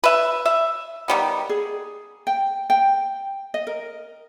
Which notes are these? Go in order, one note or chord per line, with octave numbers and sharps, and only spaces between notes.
B4 E5
E5
D#3 G3 B3
G#4
G5
G5
D#5
A#4